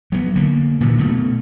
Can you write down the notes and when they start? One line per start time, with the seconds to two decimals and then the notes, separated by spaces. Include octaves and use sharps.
0.12 F#3 G3 B3
0.36 D3 A#3
0.81 A#2 D#3 E3 F#3
0.98 B2 A3